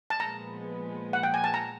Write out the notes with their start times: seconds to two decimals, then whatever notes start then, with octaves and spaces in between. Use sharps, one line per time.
0.10 A5
0.20 A#2 F3 G#3 B3 A#5
1.13 F#5
1.23 G5
1.34 G#5
1.44 A5
1.54 A#5